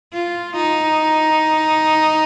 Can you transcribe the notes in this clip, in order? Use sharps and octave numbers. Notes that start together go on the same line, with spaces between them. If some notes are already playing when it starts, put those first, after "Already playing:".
F4
D#4